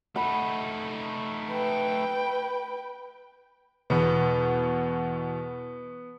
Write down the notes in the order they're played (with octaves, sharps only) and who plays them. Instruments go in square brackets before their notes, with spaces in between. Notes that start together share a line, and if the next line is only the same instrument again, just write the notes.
[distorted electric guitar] A3 D#4 [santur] F#5 B5
[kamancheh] B4 G5
[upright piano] E2 B2 [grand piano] B3